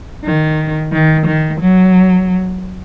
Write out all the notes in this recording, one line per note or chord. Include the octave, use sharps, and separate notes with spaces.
D#3
D#3
D#3
F#3